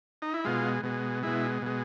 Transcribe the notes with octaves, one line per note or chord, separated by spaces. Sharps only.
D#4
E4
B2 G#3 F4
B2 G#3
B2 G#3 E4
B2 G#3